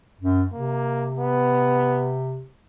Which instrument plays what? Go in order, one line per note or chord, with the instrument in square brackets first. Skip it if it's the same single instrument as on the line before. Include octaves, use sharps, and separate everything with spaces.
[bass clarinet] F#2
[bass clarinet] C3 [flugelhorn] A#3
[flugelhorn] B3